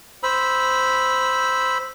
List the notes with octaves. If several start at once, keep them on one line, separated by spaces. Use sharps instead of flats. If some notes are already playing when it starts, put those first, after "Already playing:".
C5 B5 E6